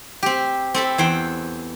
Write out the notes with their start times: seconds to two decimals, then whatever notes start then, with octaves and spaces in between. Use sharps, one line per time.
0.23 C4 G4
0.74 C4 A4 B5
0.98 E2 C5 G5